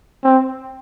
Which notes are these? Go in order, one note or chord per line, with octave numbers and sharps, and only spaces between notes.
C4